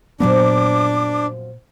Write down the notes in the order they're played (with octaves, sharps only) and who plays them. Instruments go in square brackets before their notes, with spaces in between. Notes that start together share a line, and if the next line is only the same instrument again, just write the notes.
[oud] F#2 F3 A#3 [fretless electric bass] A#2 F#3 B3 [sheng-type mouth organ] D4 [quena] D6